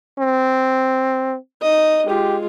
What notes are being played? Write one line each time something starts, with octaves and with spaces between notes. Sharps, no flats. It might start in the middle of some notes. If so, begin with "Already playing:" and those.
C4
D#4 D#5
G#3 F4 G4